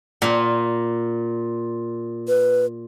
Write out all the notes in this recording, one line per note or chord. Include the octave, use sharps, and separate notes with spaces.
A#2
B4